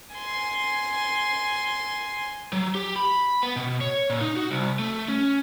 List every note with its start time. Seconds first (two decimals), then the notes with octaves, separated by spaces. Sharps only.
0.15 G#5 C6
2.53 F#3
2.75 G4
2.96 B5
3.43 B3
3.56 B2
3.81 C#5
4.10 A#2
4.21 D#4
4.36 F#4
4.51 C2
4.79 A3
5.08 C#4